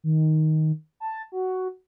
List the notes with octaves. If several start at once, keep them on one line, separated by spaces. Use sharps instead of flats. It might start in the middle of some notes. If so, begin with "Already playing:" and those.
D#3
A5
F#4